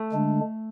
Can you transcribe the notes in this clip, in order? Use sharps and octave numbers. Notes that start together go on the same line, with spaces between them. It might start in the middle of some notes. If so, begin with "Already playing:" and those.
Already playing: A3
D3 G#3 D4